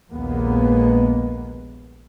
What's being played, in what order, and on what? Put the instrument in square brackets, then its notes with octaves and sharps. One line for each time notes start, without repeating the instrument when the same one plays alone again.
[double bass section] A#1 D#2 G#3 A#3 B3